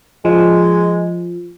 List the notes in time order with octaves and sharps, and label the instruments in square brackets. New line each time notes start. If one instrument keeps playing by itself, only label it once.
[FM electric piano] F3 [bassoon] G#3